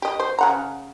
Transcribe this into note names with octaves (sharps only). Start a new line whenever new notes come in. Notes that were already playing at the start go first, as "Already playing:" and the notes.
G4 D#5
C5
C#3 F#5 A#5